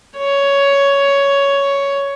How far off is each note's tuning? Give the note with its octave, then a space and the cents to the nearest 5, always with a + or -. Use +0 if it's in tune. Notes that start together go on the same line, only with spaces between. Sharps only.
C#5 +10